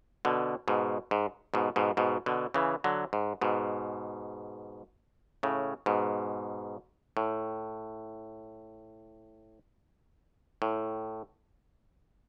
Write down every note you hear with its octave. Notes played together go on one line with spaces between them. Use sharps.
B2 D3
G#2 B2
G#2
G#2 B2
G#2 B2
G#2 B2
B2 D3
C#3 E3
D3 F#3
G#2
G#2 B2
A2 C#3
G#2 B2
A2
A2